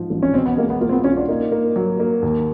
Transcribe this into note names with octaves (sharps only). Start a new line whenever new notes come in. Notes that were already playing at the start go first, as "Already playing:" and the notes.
Already playing: G#2 F3
A1
C#4
B2 C4
B3
G#3 A#3
B3
A#3 F4
C4
B3
C#4 F4
D4
A#3 D#4
A#3
F#3
A#3
D#2